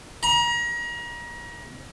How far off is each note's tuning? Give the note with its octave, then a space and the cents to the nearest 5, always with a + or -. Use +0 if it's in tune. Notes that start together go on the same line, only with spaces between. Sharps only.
A#5 +35